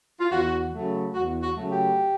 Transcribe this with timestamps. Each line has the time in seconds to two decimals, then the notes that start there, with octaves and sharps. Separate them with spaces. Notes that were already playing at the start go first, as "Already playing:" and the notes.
0.20 F4
0.32 E2 F#4
0.74 C#3 F#3 A3
1.14 E2 F#4
1.43 F#4
1.56 C#3 F#3 A3
1.71 G4